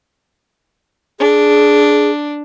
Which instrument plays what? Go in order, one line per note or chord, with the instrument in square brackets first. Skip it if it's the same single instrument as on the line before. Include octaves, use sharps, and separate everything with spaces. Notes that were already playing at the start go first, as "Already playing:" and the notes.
[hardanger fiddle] D4 [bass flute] G#4